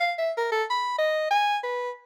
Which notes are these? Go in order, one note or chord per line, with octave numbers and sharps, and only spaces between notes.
F5
E5
A#4
A4
B5
D#5
G#5
B4